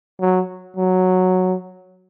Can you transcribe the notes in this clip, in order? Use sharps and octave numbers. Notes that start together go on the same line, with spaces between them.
F#3
F#3